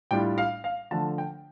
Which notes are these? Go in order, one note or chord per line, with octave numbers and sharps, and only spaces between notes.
A2 G3 D4 F4 G5
F5
F5
D3 F3 A3 A5
G5